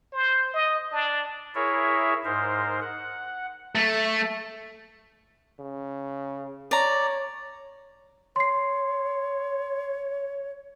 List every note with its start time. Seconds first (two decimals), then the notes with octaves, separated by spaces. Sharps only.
0.13 C5
0.53 D#5
0.92 D4
1.55 E4 G#4 A#4 C#5 E5
2.25 G#2 A#4 C5
2.82 F#5
3.75 A3
5.59 C#3
6.71 C#5 D5 A#5
8.36 C#5 C6 C7